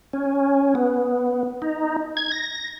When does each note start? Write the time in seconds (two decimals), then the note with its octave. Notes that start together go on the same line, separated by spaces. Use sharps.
0.13 C#4
0.75 B3
1.62 D#4
2.17 G#6
2.32 A#6